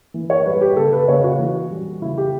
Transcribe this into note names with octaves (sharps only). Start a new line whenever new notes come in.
E3
C#5
G3 B4
G4
C#3 A4
B4
C#3 C#5
F#4
E3
G3
C#3 E4
G4